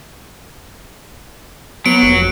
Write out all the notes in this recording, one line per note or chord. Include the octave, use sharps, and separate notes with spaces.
F#3 B3 D7
F1